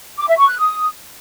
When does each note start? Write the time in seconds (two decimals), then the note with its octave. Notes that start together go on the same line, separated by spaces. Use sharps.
0.18 D6
0.28 E5
0.38 C#6
0.49 F#6
0.59 D#6